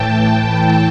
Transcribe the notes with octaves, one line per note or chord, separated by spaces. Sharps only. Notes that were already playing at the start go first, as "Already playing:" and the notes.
Already playing: A2 E3 G5 A5
G5